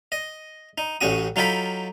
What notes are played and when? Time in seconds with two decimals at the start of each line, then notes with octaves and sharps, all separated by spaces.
0.12 D#5
0.78 D#4
1.01 A1 A2 C#4 F#4 D#6
1.36 F#3 D#4 F4 A4 G5 B5